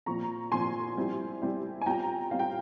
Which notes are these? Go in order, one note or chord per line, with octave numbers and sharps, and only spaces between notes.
A#2 F3 C4 A#5 C#6
A#2 F3 C4 G#5 C6
G3 C4 E4
G3 C4 E4
G#5
G3 C4 F4 G5 A#5
G3 C4 F4 F5
G5